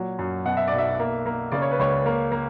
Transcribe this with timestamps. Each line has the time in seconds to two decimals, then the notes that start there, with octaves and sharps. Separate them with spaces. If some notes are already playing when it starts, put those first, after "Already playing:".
Already playing: A#2 F#3
0.19 F#2
0.46 B2 F#5
0.57 E5
0.68 D5
0.73 B1
0.78 E5
0.99 A#3
1.26 A#3
1.52 C#3 D5
1.62 C#5
1.71 B4
1.79 C#2 C#5
2.06 A#3
2.32 A#3